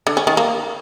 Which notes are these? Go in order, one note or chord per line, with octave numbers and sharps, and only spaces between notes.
D3
C#4
D#3
A#3